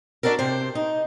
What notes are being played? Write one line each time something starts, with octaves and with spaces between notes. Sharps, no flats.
D4 D#4 F#4 A4 A#4
C3 C5
D#4